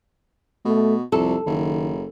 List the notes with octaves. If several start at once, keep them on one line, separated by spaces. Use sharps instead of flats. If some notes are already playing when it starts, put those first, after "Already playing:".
B2 A3
C2 F2 A4
F#1 D#3